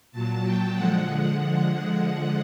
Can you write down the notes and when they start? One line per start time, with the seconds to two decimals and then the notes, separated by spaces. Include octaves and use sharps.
0.12 A#2 F#3 A5
0.43 G5
0.74 D3 F3 G#3 F#5